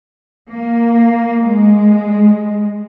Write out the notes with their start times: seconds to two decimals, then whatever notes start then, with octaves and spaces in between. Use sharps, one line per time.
0.49 A#3
1.45 G#3